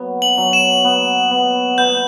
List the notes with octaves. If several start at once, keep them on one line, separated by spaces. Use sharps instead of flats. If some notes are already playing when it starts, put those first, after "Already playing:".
Already playing: F#3 B3
F#7
F#3
E7
B3
B3
B3 G6